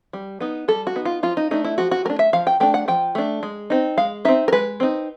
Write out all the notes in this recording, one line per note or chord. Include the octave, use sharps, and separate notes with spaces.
G3
B3 D#4
G3 A4
F#4
B3 D#4
F4
F3 F4
D#4
A3 D4 D#4
E4
F3 F#4
F#4
A3 D4 A#4
E5
F3 F5
G5
A3 D4 G5
F#5
F3 G5
A3 D4
G#3
C4 D#4
G#3 F5
C4 D#4 E5
A#4
G#3 B4
C4 D#4